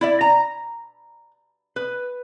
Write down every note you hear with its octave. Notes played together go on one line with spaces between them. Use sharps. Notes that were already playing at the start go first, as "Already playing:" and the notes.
E4 D5 E5
A#5
B4